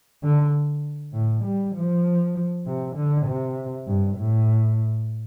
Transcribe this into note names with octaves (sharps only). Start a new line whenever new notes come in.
D3
A2
G3
F3
C3
D3
C3
G2
A2